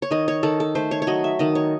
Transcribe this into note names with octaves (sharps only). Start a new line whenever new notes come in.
C#5
D#3 D#5
C#5
D#3 A4
A4
A3 C5
C#5
C#5
F#3 D#5
E5
D#3 D#5
C#5